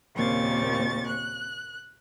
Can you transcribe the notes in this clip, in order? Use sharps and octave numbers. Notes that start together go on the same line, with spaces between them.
D#2 A#2 C#3 C4 C#6 A6
F#6